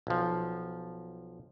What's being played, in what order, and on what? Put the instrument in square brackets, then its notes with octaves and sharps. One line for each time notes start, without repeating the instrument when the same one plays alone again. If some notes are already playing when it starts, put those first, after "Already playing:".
[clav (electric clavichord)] B1 F3